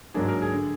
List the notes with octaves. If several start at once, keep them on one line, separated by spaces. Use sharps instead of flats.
G#2 F#3 A#3 D4 G#4
A#4
G#4
D3